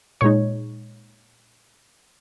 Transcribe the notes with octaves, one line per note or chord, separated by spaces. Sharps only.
A#2 G#3 D#4 C#5